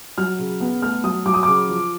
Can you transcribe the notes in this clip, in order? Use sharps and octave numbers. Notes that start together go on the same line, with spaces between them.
F#3 F6
C#3
B3
A3 F6
F#3 D#6
F#3 D6
D#6
C#3 D6
F3